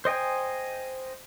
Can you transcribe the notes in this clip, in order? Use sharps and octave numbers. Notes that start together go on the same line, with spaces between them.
C5 D#5 G5 G#5